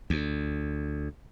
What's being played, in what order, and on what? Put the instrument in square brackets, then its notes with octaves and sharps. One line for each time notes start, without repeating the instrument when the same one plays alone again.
[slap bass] D2